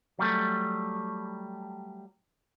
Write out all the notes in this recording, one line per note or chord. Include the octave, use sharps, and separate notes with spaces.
F#3 G3 A3